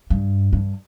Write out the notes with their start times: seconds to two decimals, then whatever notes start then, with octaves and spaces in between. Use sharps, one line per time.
0.10 G2
0.53 G2